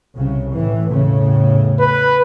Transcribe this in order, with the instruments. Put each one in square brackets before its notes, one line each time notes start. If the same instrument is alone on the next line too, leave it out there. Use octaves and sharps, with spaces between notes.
[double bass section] C2 C#3
A2 E3
E2 A2 C#3
[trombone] B4